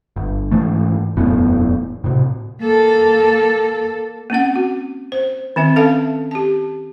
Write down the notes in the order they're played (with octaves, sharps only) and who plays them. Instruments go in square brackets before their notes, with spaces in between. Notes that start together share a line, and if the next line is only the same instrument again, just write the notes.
[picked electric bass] G1
G#2 E3 A3
E1 F#2 A2 B3
A2 C3
[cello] A#3 A4
[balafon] A#3 C4 C#4 F#5
F#4
C5
D#3 C4 E5
C#4 A4 E5 F5 A5
G4 A5